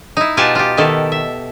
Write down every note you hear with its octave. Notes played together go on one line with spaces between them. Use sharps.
D#4 E4
B2 F4 G4 F#5 G#5 A5
F4 G4
B2 D#3 E4 A4
E5